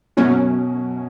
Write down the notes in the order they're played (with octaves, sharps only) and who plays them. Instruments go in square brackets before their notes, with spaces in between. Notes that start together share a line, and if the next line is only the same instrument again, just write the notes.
[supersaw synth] F#2 F#3 C#4 [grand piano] B2